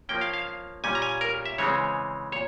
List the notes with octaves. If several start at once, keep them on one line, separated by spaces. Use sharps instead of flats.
F3 A#3 C#4 G5
F5
F5
A#2 G3 C#4 G#5
A#5
G#5
A#4
E5
C#3 E3 G#3 C4 C#5
A#2 C#5